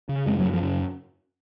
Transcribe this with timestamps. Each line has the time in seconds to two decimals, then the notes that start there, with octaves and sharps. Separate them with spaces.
0.09 C#3
0.26 F#2 G#3 C4
0.40 F#3 A#3
0.45 F#2
0.54 F3
0.62 C#3